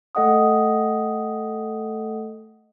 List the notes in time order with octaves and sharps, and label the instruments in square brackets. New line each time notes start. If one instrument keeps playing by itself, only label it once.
[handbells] A3 A4 D#5 F#5 G5 D#6